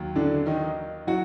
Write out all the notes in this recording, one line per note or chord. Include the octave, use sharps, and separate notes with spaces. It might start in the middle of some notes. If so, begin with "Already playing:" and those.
Already playing: D#2 F#3
D3 D4
D#3 D#4
F#3 F#4